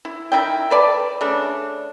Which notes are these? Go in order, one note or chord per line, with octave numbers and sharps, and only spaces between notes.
E4
D#3 D4 E4 G5
A4 B4 D5 A5
C#3 A3 D4